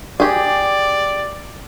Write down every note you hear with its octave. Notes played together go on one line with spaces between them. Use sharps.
G4 G#4 D5